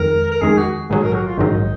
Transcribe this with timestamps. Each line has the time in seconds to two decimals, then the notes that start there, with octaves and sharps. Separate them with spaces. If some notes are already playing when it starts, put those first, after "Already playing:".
Already playing: F2 D#3 G#3 A#4
0.32 A#4
0.41 F2 D#3 G#3 G#4
0.58 F#4
0.90 A#1 G#2 D#3 F#3 G#4
1.02 A#4
1.13 F#4
1.26 F4
1.37 A#1 G#2 D#3 F#3 D#4